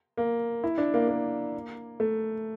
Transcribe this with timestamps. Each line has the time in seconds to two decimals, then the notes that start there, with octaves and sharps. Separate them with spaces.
0.17 A#3
0.64 E4
0.78 D4
0.94 A#3
1.08 A#3
2.00 A3